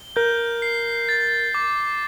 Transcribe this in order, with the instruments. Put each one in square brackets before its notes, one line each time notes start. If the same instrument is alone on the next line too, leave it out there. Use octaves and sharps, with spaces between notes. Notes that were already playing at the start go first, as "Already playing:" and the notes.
Already playing: [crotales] G7
[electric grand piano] A#4 [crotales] G6
[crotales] C7
A6
D6